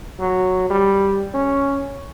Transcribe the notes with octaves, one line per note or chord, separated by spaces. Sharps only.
F#3
G3
C#4